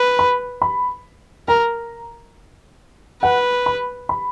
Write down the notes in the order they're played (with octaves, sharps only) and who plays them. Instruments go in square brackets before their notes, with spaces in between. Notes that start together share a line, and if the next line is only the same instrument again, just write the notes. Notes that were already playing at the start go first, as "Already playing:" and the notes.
Already playing: [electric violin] B4
[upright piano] B5
B5
[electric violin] A#4 [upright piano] A#5
[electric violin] B4 [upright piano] F#5
[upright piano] B5
B5